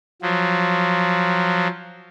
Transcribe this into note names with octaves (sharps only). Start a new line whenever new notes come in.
F3 F#3